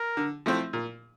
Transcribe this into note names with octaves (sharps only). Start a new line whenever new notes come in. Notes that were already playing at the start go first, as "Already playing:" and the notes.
Already playing: A#4
D3
F3 A3 C4 E4
A#2